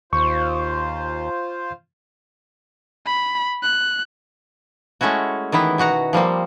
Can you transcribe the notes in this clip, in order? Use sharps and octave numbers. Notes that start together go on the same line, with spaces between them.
D#2 F4 C5 C#6
B5
F#6
G#3 A3 C#4 E4 F#4
D#3 E3 B3 E4
B2 F#4 F#5 A#5
F3 G3 A#3 C4